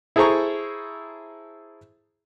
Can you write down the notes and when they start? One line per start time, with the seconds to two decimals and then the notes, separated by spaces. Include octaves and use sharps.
0.16 E4 G#4 A4 C5 A#5 C#6